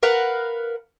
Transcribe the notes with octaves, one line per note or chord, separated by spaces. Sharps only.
A#4 B4 F5 F#5